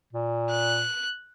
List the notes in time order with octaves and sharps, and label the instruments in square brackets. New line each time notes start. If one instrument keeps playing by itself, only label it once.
[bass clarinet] A#2
[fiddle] F#6